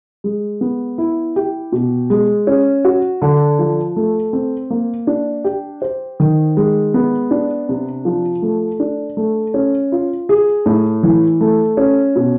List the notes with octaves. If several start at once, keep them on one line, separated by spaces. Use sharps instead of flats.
G#3
B3
E4
G4
B2
G#3
C#4
F#4
D3
F3
A3
C4
A#3
D4
G4
C5
D#3
G#3
B3
D4
C3
F3
A3
D4
A3
C#4
F4
G#4
A2
E3
A3
C#4
B2